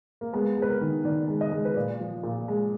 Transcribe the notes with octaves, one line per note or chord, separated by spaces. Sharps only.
A#3
G#3 B3
G#3
B4
A#4
D#3
D#3 D5
G#3
D#5
G#3
B4
A#2 D5
F3
A#2
G#3